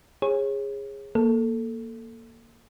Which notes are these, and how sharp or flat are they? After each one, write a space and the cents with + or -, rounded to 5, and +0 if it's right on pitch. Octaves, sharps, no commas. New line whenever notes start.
G#4 -20 C#5 -30
A#3 +0 A4 +5